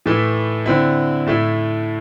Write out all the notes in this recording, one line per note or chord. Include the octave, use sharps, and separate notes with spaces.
A2 E3 A3 E4
D3 C4 E4
A2 A3 E4